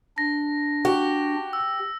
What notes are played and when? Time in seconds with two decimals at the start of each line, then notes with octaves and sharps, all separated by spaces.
0.18 D4 A#6
0.85 F#4 G4
1.53 E6